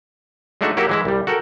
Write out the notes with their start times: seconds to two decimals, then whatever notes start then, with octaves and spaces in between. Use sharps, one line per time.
0.61 G#3 A3 D4 D#4 F#4 E5
0.77 F#3 A#3 E4 F#4 G4
0.89 E3 G#3 E4
1.05 C2 G3
1.27 F#4 A4 A#4 G5